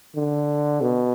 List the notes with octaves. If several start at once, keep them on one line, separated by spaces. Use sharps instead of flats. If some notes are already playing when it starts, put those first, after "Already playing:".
D3
B2